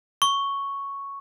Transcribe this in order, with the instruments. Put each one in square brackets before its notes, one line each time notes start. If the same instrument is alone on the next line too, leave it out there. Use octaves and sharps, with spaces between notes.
[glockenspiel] C#6